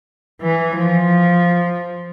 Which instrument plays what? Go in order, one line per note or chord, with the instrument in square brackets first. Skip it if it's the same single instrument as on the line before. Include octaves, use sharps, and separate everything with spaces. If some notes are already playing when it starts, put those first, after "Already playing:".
[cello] E3
F3